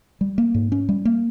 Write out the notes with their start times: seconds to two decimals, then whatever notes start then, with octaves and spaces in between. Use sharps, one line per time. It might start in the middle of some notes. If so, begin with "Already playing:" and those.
0.21 G3
0.38 A#3
0.54 G#2
0.72 C#4
0.89 G3
1.05 A#3